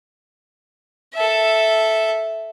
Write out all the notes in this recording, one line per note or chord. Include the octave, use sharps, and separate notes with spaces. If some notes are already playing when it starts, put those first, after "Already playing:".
A4 E5